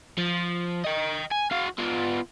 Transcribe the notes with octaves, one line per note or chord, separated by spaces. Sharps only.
F3
D#5 G5
G#5
F#4 F5
B3 F4